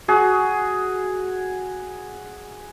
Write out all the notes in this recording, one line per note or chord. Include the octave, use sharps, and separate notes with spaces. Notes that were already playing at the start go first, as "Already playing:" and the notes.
F#4 G#4